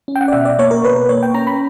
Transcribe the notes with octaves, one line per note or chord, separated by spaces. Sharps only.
C#4
G5
F#5
D5
B2 E5
D5
A#3 C#5
A#4
B2 B4
B4
A#3 C#5
G5
C#4 A#5
B5